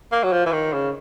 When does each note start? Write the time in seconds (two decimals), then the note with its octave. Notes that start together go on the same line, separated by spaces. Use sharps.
0.12 A#3
0.23 F#3
0.32 F3
0.46 E3
0.52 D#3
0.73 C#3